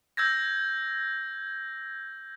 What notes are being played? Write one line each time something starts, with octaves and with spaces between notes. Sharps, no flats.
E6 G6 G#6 A#6